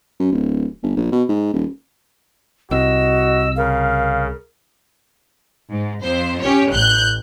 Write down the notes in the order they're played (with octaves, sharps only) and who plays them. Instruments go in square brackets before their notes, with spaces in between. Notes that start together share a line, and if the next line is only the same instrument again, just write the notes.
[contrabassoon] F#2
D1
G1
A#1
B2
G#2
D#1
[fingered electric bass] C2 C3 [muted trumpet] F#4 [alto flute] D#5 [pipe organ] E6
[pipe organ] C#3 [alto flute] A#4 [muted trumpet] F5
[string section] G#2
F2 C5
C#4 G4 C#5
A1 F#6 G6